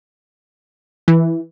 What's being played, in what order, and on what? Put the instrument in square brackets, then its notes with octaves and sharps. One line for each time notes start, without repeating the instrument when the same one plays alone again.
[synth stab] E3